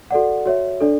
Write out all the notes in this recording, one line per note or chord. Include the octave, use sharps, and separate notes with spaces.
F#4 A4 D5 F#5
F#4 C#5 E5
D4 A4 D5